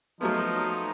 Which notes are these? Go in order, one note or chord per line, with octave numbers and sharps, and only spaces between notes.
F3 F#3 A3 B3 D#4